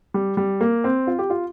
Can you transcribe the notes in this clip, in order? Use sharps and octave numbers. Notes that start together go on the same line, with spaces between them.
G3
G3
A#3
C4
F4
G4
F4